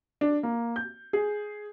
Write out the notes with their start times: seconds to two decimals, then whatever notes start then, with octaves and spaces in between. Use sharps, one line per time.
0.21 D4
0.43 A#3
0.76 G6
1.13 G#4